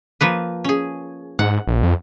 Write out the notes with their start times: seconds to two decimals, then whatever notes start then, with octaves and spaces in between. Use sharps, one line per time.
0.21 F3 A#3 B4
0.64 C#4 G#4
1.39 G#2 F#5
1.67 A#1
1.83 F2